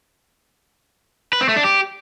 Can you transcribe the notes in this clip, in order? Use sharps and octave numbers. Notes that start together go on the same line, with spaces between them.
B4
C4
A3
D4
G4